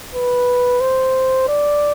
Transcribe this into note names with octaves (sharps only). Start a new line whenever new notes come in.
B4
C5
D5